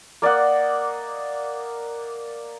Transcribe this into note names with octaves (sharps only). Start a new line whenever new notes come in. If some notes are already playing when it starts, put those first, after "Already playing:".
A#3 D5 D#5 F#5